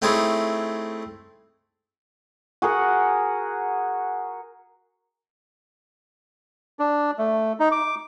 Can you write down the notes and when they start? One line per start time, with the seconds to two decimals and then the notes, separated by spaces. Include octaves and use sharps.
0.02 A3 C4 D#4 E4 G#4 C#5
2.62 F#4 G#4 A#4 F#5
6.79 D4
7.19 A3
7.60 D#4
7.71 D6